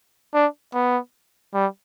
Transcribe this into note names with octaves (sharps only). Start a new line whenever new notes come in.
D4
B3
G3